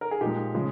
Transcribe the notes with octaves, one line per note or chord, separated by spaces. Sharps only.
A#4
G#4
A#2 F3 G#3 D#4 G4
C#3 F3 G#3